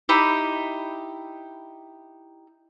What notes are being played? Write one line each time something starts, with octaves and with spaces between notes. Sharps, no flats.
D#4 E4 G4